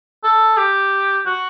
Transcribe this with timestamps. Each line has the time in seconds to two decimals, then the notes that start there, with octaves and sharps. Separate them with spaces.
0.24 A4
0.57 G4
1.26 F#4